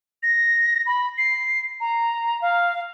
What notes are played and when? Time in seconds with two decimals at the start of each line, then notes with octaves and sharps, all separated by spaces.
0.23 A#6
0.86 B5
1.18 C7
1.80 A#5
2.41 F5